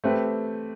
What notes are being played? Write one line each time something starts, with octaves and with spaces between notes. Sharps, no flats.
A3 C4 G4 B4